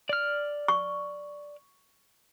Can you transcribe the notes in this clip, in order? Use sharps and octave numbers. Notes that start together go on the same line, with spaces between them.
D5 F6
C#6